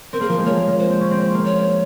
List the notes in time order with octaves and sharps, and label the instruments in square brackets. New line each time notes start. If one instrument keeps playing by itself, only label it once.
[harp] C4 [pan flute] A#4
[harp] A#3 [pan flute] G#4
[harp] F3 [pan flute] A#4
[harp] G#3
[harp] A#3 [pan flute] C#5
[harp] A#3
G#3
[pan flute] C5
[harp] C4
C#4
C4
C4
A#3
[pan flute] C#5